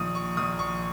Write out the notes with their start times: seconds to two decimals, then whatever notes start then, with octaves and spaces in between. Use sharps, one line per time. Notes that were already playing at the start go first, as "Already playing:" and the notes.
Already playing: A#1 D#3 C#6 D#6
0.15 C#6
0.37 A#1 D#6
0.59 C#6